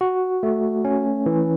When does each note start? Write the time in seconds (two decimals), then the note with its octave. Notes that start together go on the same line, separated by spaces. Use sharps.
0.01 F#4
0.43 A3
0.85 C#4
1.26 E3